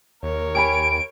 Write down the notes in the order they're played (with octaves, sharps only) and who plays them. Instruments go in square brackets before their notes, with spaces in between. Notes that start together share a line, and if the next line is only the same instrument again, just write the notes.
[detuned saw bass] D#2 [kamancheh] A#4 C#5
[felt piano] G4 G#5 B5 [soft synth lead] D7